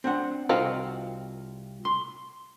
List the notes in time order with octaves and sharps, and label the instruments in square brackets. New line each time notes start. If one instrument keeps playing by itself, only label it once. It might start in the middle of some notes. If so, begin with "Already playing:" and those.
[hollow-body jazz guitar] C4 D4 F#5
[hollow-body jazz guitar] C2 F4 F#4 [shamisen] C4 D#4 F5
[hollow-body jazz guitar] C6